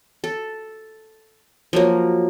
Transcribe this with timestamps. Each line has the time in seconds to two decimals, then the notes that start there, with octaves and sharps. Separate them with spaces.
0.24 A4
1.73 F3 F#3 A#3